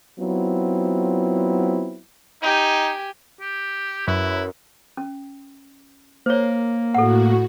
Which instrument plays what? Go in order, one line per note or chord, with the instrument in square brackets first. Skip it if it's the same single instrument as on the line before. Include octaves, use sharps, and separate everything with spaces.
[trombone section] F#3 B3 C4 E4 F4
[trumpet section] D#4 [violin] G4 G#5
[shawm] G4
[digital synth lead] F#2 [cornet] E4 [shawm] B4
[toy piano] C#4
[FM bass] A#3 [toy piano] C5 C#5
[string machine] A2 F#4 [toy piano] A4 F#5